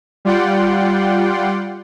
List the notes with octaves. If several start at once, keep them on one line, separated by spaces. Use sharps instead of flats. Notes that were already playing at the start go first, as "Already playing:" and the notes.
G3 F4 D5 F#5 G5 C6